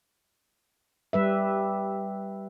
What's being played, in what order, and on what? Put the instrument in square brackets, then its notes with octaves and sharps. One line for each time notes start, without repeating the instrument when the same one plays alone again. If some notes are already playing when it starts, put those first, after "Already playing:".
[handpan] G3 B4 E5